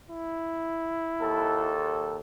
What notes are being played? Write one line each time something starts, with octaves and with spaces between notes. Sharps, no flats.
E4
D#2 A4